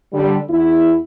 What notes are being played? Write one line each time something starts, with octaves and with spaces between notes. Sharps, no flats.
D3 G3
E2 E4